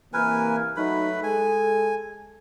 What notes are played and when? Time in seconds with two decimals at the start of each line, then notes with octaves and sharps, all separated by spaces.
0.14 C3 E3 A#3 A#4 B4 G#5
0.77 F#3 A3 D#4 B4 B5
1.23 G#3 A4 G#5